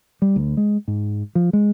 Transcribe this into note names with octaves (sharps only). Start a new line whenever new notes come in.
G3
D2
G#3
G#2
F3
G#3